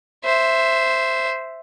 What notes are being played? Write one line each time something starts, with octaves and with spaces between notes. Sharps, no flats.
C5 E5